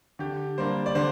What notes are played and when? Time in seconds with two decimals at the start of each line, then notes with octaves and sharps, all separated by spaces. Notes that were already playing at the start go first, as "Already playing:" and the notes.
0.19 D3 G4
0.58 G3 A#3 D4 C5
0.86 D5
0.95 D3 C5